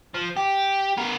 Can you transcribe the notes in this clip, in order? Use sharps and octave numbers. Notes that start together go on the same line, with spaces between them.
F3
G4
B3 A#4